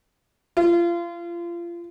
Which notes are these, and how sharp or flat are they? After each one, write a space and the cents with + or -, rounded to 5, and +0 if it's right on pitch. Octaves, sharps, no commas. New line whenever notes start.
F4 -30